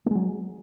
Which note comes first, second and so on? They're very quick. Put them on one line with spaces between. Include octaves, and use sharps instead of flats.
A3 G#3 F#3